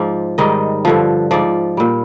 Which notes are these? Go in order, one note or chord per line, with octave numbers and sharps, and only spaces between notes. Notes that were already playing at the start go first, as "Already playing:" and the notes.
Already playing: G#2 F3 C5 D5
G#2 D#3 G3 D#5
G2 D3 F3
G#2 F3 D5
A#2 G3